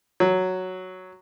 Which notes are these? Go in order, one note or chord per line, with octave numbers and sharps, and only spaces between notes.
F#3